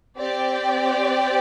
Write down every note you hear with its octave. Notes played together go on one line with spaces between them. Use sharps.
C4 G4 D5 G5